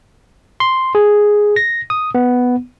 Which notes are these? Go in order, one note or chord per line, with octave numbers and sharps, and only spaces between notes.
C6
G#4
A#6
D#6
B3